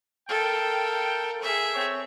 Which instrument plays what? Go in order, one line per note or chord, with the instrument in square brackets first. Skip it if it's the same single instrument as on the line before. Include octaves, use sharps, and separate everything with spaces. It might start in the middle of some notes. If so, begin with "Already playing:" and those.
[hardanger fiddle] A4 A#4 [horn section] F5 G5
[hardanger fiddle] G#4 E5
[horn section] C4 C#5